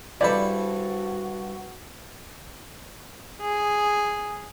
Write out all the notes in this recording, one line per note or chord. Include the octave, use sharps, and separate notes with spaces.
G2 E4 F#4 A4 C5 D5 B5
G#4